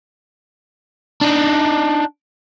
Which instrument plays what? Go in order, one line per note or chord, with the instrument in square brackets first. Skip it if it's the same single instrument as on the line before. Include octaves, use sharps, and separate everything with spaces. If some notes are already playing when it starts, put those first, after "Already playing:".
[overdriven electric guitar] D4 D#4